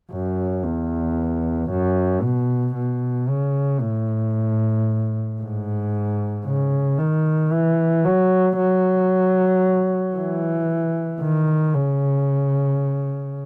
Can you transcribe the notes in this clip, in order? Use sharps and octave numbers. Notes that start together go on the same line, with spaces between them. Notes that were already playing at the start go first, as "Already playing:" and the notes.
F#2
E2
F#2
B2
B2
C#3
A2
G#2
C#3
D#3
E3
F#3
F#3
E3
D#3
C#3